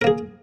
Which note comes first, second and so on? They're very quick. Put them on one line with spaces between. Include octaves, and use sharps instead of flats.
A#4 A#3 G#4